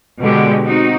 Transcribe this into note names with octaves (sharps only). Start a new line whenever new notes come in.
B2 D3 G#3 B3 G4
C4 D#4 F#4